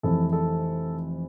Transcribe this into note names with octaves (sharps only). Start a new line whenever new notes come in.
F1 F2 E3 A4
A4